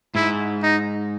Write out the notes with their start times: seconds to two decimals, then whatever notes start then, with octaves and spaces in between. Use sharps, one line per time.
0.15 G#2 E4
0.62 D#4